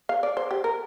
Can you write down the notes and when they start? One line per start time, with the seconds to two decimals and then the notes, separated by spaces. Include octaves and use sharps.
0.09 F5
0.23 D5
0.37 C5
0.51 G4
0.64 A#4